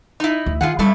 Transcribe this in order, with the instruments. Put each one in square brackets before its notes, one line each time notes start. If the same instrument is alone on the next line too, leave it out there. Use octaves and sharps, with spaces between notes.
[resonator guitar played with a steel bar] D#4 E4
[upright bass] D2
[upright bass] D#3 [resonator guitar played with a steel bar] F4 G#4 F#5
[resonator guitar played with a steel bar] G2 A3 E4 [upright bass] G3 C#4